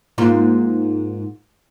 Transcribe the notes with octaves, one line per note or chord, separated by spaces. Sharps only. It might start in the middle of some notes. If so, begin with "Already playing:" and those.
G#2 A#3 F4